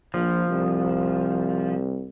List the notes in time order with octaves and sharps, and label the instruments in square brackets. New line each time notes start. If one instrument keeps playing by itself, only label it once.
[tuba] A#1 [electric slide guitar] F3
[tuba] C2